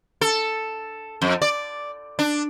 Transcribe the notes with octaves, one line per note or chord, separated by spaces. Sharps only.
A4
F2
D5
D4